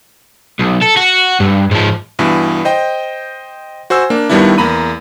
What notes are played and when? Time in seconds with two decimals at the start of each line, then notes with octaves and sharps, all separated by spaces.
0.60 B1
0.82 A4
0.97 F#4
1.40 G2
1.71 G#2 F3
2.19 G2 B2 E3
2.65 C5 D#5 G5
3.90 F#4 C5 G#5 E6
4.10 A#3 D4
4.29 G2 D#3 G3 B3 D4 E4
4.58 E2 A#3 A#5 B5 D#7